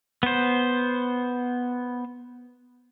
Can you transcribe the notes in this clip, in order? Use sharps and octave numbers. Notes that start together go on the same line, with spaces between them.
B3 C5